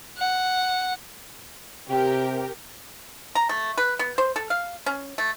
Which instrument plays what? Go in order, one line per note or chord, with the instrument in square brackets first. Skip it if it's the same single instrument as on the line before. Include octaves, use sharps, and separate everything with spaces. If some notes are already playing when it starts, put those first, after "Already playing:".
[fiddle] F#5
[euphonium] C3 [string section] G4 A#4
[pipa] A#5
A3
B4
B3
C5
A4
F5
C#4
A3